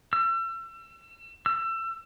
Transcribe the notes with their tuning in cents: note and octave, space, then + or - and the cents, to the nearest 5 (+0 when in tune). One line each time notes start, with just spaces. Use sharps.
E6 +35
E6 +30